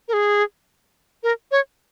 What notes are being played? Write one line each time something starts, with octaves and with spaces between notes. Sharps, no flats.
A#4
G#4
A#4
C#5